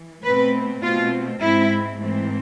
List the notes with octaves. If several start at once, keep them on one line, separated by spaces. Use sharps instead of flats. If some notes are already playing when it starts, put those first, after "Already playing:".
Already playing: E3
B2 A3 C4 B4
B2 A3 C4 F4
G#2 G#3 C4 E4
G#2 E3 A3 C4